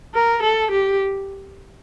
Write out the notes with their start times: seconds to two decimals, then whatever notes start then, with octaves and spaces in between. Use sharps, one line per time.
0.14 A#4
0.43 A4
0.72 G4